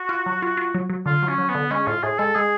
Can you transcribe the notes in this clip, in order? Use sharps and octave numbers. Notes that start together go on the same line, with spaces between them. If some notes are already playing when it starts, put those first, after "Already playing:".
Already playing: F#4
F4
F#3
F4
F4
F#3
F#3
D3 F4
F#3
C#4
F#3
B3
D3
G#3 C#4
A2 F4
A2 G#4
G#3 A4
G#3 G#4